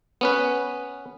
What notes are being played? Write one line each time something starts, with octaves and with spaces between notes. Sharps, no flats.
B3 C#4 B4